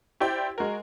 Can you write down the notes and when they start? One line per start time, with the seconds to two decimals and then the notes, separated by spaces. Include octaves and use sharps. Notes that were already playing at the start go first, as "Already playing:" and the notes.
0.20 E4 G4 C5 D5 G5
0.58 G#3 F#4 A#4